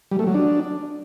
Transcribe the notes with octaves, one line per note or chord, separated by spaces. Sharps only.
G3
A3
F#3
D4